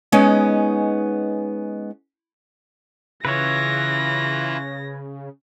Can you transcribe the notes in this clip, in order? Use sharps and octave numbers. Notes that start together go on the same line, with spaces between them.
G#3 B3 C#4 D#4
C#3 E3 E4 F4 B4 C#5 A#6